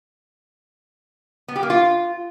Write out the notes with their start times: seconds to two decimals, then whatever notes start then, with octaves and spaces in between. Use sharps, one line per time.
1.48 B3
1.56 G4
1.63 A#3
1.70 F4